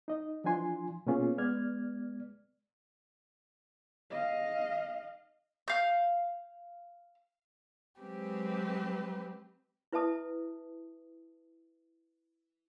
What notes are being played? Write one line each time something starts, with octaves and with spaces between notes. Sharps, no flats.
D#4 D#5
E3 F3 D4 F4 G#5 C6
B2 A#3 B3 C#4 F4 G#4
G#3 B3 D5 F6 G#6
D#5 F5
F5 G6
F#3 G#3 C4 G4 B4
E4 B4 E5 A5 D#6